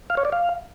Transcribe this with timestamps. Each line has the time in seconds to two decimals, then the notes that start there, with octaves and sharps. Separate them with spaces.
0.10 F5
0.17 C#5
0.25 D5
0.32 F5